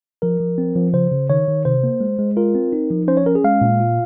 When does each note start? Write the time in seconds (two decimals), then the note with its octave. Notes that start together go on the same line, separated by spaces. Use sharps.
0.22 F3 A#4
0.40 F3
0.58 C4
0.76 F3
0.93 C#3 C5
1.12 C#3
1.30 D#3 C#5
1.48 D#3
1.65 C3 C5
1.83 A#3
2.01 G#3
2.19 G#3
2.37 F4 A#4
2.55 C4
2.72 D#4
2.90 F3
3.08 C#4 C5
3.17 C#5
3.26 C#4 A#4
3.35 G#4
3.44 G#3 F5
3.61 A#2
3.80 F4